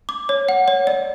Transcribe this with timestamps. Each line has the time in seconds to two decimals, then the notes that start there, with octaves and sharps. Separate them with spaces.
0.09 D6
0.29 C#5
0.49 F#5
0.68 C#5
0.87 D5